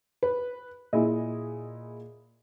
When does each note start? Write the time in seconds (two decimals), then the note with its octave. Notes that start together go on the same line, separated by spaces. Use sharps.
0.23 B4
0.93 A#2 E4 G#4 D#5